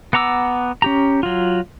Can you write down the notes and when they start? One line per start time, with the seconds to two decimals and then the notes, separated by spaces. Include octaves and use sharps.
0.13 B3 F#5 A#5 D6 E6
0.82 C#4 G4 A#5
1.23 F#3 F4